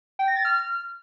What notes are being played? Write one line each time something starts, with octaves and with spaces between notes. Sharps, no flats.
G5
A#6
A6
F6